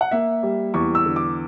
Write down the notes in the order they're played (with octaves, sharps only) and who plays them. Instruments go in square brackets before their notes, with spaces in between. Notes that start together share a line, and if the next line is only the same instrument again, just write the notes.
[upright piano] F#5
A#3 E5
G3
E2 C#6
E6
D3
D6